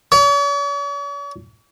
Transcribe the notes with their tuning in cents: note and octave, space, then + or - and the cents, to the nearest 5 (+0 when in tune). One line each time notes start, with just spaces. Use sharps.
C#5 +45